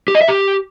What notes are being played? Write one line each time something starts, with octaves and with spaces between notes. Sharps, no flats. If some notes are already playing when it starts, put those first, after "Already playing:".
G4
D#5
E5
G4